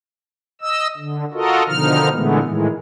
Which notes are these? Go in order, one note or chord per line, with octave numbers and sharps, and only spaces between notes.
D#5 E6
D3
F4 F#4 A4 A#4 D#5
B2 D3 D#3 F3 D#4 F6
A#2 D3 E3 G#3 A3 B3
A2 D#3 E3 G#3